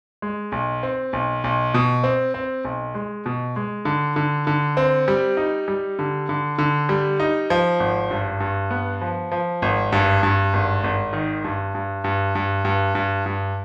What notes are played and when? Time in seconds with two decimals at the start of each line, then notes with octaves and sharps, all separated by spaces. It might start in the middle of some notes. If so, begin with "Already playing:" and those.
0.22 G#3
0.52 B1
0.83 C4
1.13 B1
1.44 B1
1.74 B2
2.03 C4
2.34 C4
2.65 B1
2.95 G#3
3.26 B2
3.56 G#3
3.85 D3
4.16 D3
4.47 D3
4.77 C4
5.08 G3
5.37 D#4
5.68 G3
5.99 D3
6.29 D3
6.59 D3
6.89 G3
7.20 D#4
7.50 F3
7.80 G#1
8.11 G2
8.40 G2
8.71 B3
9.02 F3
9.32 F3
9.62 G#1
9.92 G2
10.23 G2
10.53 G#1
10.84 G#1
11.13 D#3
11.44 G2
11.75 G2
12.04 G2
12.35 G2
12.65 G2
12.95 G2
13.26 G2